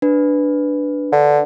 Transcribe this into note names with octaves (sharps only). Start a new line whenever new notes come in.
D4 B4
D3